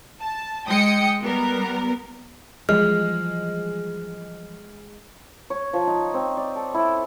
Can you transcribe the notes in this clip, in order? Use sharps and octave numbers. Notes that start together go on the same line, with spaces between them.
A5
G#3 G5 D#6 C#7
G3 B3 A#4
E3 F3 G3 G#3 F6
C#5
F3
D#4
C4
D5
A4
E4